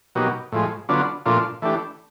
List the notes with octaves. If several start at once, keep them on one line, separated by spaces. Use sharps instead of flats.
B2 F#3 A#3 D#4 G4
A2 F3 G#3
D3 F#3 B3 D4 F4
A#2 F3 A3 D4 F4
E3 A3 D4 G4